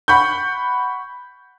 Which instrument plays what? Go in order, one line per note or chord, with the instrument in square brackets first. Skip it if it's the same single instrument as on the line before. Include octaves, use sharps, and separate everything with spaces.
[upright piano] F#5 B5 C#6 G6